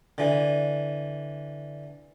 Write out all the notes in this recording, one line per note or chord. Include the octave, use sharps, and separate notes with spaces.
D3 E3